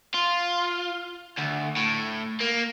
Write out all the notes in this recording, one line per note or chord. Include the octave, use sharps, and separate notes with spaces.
F4
D2
A2
A#3